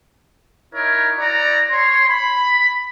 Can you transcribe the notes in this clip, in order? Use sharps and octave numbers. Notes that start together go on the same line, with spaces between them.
D#4 E4 A#4 C#5
E4 F#4 D5 A#5
C#5 C6
B5